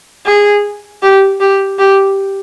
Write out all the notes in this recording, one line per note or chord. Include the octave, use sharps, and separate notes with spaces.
G#4
G4
G4
G4